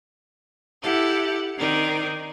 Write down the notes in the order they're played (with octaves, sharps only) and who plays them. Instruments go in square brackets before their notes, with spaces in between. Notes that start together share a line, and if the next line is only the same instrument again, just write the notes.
[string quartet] E4 G4 A4 F#5
D#3 C4 D#4 A#4 D5